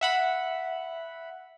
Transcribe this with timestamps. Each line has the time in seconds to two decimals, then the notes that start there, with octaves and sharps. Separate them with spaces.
0.01 E5 F#5 B5